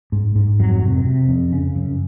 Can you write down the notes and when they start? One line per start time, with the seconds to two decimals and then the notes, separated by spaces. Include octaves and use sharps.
0.12 G#2
0.35 G#2
0.59 F2 F#3
0.83 C3
1.05 C3
1.29 F2
1.52 C#3
1.75 F#2